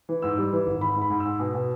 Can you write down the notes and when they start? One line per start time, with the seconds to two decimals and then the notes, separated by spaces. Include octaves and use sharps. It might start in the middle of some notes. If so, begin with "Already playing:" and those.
0.09 E3
0.22 G#2 E6
0.38 G3
0.53 E3
0.67 G#1
0.81 G#2 B5
0.96 G#2
1.02 B5
1.10 G#2
1.20 E6
1.25 G#2
1.40 B2
1.55 B2